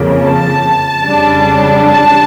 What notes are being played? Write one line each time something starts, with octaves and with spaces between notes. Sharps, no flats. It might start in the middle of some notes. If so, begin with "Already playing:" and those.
Already playing: F2 C#3 F3 A#3
A5
F2 C#3 G3 D4
A5